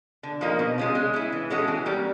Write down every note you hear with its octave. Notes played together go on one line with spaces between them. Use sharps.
D3
F3 A#3 D#4
B2
G#3 C#4 F4
G#3
C#4 E4
E3
G#3 C#4 F#4 A4
E3
G3 A#3 C#4